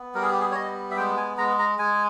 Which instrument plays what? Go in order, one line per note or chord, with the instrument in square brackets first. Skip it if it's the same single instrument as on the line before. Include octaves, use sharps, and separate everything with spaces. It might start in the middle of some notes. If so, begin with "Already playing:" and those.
Already playing: [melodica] B3
G3 A#4
G#4
G4
G#4
C#5
B3 D#5
E5
G#3 G5
G#5
G#3 A#5
A#5
G#3 G#5